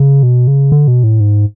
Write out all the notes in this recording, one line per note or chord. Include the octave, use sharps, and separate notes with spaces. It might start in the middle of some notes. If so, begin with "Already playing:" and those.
Already playing: C#3
B2
C#3
D3
B2
A2
G#2